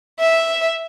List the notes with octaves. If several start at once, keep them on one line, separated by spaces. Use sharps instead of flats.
E5